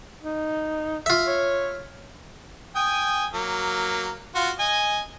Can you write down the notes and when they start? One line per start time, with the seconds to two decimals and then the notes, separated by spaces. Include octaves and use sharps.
0.23 D#4
1.06 F4 E5
1.27 C#5
2.76 G5 G#5 D#6
3.34 F#3 A#3
4.35 F4 F#4
4.60 D#5 G#5